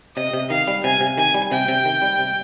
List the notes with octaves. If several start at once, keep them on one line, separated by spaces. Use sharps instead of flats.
C3 D#5
C3
D#3 F5
G3
C3 G#5
C3
D#3 G#5
G3
C3 G5
C3
D#3
G3
C3